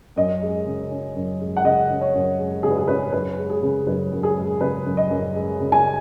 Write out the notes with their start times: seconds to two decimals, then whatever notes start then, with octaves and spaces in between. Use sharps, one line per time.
0.16 F#2 D#5
0.42 G#3
0.66 C#3
0.91 C#4
1.15 F#2
1.40 G#3
1.57 F#5
1.64 C#3 D#5
1.90 C#4
2.01 C#5
2.14 F#2
2.39 G#3
2.63 C#3 G#4
2.71 B4
2.78 G#4
2.88 C#4 B4
3.12 F#2 B4
3.38 G#3
3.50 G#4
3.63 C#3
3.86 F#2 B4
4.12 F#2
4.23 G#4
4.37 G#3
4.61 C#3 B4
4.85 F#2
4.97 D#5
5.10 F#2
5.35 G#3
5.60 C#3
5.72 G#5